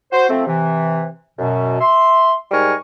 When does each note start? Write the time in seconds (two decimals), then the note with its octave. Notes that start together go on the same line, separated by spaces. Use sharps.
0.12 F#4 C5
0.30 F3 A3 C4
0.46 C3 E3
1.38 F#2 B2
1.80 E5 C6
2.51 G#2 G3 A#4 G#5 C#6